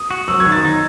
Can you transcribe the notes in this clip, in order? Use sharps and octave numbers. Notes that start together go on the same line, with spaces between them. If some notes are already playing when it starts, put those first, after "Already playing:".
Already playing: D#6
F#4
F#3 E6
G#6
D#3
A6
D#4